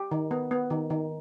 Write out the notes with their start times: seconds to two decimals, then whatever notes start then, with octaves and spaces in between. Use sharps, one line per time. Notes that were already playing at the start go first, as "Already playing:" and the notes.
Already playing: G4
0.11 D#3
0.31 B3
0.51 B3
0.70 D#3
0.90 D#3